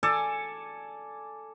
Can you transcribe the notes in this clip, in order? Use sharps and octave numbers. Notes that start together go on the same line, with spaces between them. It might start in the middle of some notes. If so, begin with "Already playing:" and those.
A4 D5 G#5